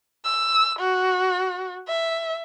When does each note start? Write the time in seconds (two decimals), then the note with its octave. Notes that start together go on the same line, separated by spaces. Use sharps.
0.25 E6
0.79 F#4
1.88 E5